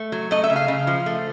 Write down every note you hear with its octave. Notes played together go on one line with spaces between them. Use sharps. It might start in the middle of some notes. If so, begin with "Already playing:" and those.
Already playing: A3
F#3
A3 D#5
E5
C#3
F5
C#3
F3
A3